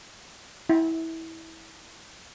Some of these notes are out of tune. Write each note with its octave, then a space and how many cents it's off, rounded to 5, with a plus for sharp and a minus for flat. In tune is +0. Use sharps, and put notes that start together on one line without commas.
E4 -20